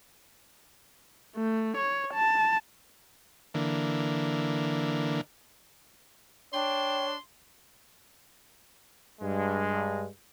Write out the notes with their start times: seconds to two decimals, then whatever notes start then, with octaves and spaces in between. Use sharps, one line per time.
1.37 A3
1.77 C#5
2.14 A5
3.54 D3 E3 A#3
6.53 D4 C#5 G5 C6
9.21 G2 G#3